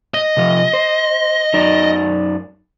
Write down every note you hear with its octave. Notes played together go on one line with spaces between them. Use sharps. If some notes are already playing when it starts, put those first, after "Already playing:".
D#5
C3 F3 F4
C5
F#2 D#4 D5